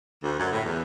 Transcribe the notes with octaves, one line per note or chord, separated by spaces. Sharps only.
D2
F#2
A2
E2